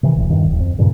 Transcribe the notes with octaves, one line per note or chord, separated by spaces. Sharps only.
C3 D#3 E3
D#1 A1 E2
E2 G2 D#3
D1
F2
G2 A#2 C#3